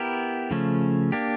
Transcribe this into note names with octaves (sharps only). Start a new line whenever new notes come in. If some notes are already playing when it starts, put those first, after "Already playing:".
Already playing: B3 E4 G4 A#4
C#3 F3 A3 C#4
A#3 D4 G4